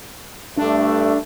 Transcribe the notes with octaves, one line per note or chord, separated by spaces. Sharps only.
G2 A3 D4